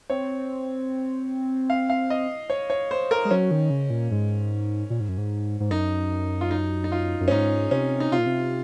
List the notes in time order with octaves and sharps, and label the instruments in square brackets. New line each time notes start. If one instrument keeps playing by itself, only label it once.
[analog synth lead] C4 [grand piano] C#5
[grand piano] F5
F5
D#5
C#5
C#5
C5
A#4
[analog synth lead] G#3
[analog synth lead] F#3 [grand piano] C#4
[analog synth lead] D#3
C#3
A#2
G#2
A#2
G#2
F#2
G#2
G#2
[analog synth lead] F#2 [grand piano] D#4
[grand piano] F4
D#4
D#4
F4
[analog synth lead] F#2
[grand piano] C#4
[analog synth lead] G#2 [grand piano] D#4
[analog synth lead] C3 [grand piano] C#4
[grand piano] D#4
[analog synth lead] C3 [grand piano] F4
[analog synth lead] A#2
C3